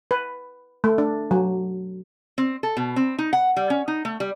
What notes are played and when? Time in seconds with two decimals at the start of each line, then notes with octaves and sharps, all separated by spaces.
0.11 B4
0.84 A3
0.98 D4
1.31 F#3
2.38 C4
2.63 A4
2.77 B2
2.96 C4
3.19 D#4
3.33 F#5
3.57 G3
3.70 C#4
3.88 D#4
4.05 A3
4.20 G3